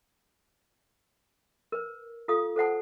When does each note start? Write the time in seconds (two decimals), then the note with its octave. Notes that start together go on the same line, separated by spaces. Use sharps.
1.72 A#4 B4
2.28 F4 A4 F5 D#6
2.56 A4 C5 F#5 A5